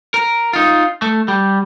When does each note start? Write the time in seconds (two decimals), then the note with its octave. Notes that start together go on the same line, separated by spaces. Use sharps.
0.14 A#4
0.53 D#4 F4
1.02 A3
1.28 G3